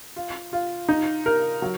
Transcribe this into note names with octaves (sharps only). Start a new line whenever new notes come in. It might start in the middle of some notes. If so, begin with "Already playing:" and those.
F4
F4
D#4
A#4
F#3